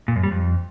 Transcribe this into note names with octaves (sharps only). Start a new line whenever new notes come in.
A#2
F#2
G3
F2